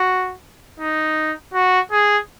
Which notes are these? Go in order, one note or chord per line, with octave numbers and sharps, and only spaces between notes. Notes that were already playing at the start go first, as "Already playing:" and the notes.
Already playing: F#4
D#4
F#4
G#4